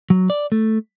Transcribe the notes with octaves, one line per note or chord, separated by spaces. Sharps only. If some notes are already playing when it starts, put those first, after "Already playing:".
F#3
D5
A3